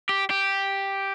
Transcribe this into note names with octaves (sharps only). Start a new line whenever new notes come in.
G4
G4